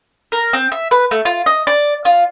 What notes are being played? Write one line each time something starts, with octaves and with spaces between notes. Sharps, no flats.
A#4
C4
E5
B4
A3
F4
D#5
D5
F4